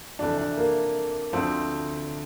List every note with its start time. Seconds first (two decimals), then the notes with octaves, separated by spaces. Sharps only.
0.19 F2 C3 E3 A3 D4
0.38 D4
0.57 A#3
1.33 D2 D3 F3 A3 C4